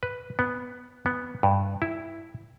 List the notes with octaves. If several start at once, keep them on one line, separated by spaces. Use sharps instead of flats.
B4
B3
B3
G2
E4